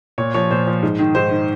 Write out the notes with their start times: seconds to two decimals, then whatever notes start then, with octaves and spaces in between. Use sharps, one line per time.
0.18 A#2 C#5
0.34 F3 C#5
0.51 A#2 C5
0.67 F3
0.83 G#2
0.99 D#3
1.15 G#2 C5
1.31 D#3